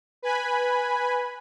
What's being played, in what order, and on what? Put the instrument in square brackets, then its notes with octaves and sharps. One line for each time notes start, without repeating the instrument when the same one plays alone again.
[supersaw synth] B4 G#5 B5